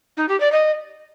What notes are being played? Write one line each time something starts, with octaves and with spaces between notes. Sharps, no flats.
D#4
G4
D5
D#5